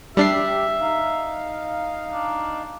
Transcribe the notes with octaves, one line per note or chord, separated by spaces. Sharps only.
G3 D4 G4 E5 C7
D#4 F5
D4